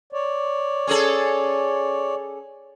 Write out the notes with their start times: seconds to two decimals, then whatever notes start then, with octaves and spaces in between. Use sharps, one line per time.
0.13 C#5 D5
0.87 C#4 G#4 A4